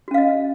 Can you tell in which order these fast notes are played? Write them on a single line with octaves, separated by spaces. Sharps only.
F#4 C#4 F5 D#5